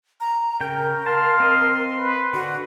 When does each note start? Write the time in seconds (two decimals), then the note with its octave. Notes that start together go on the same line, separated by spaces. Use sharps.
0.20 A#5
0.61 C#3 A#4 G5
1.06 F5 A5 C6
1.40 C4 D#5
1.98 B4
2.33 D3 F#4